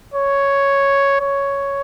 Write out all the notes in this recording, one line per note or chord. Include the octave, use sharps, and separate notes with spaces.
C#5
C#5